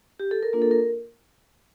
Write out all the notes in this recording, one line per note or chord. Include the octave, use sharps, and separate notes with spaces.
G4
A4
A#4
A#3 D4 F4 A#4
A4
A#4